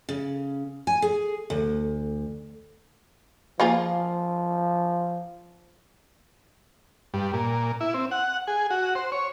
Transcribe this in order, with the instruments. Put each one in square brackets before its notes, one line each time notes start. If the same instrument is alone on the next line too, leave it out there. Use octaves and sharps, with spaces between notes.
[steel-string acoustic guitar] C#3
G#5
G#4
D2
[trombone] F3 [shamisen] A#3 F4 G#4
[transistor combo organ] G2
A#2
E4
C4
F#5
G#4
F#4
C5
C#5